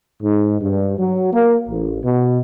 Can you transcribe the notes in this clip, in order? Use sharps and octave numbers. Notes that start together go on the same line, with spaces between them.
G#2
G2
F#3
A#3
A1
B2